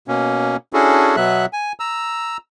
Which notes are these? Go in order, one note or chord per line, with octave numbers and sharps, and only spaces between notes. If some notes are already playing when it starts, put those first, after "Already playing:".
B2 A#3 C#4
C#4 D4 E4 F#4 G#4 A4
B2 F#3 B3 E5 F#6
G#5
A#5 E6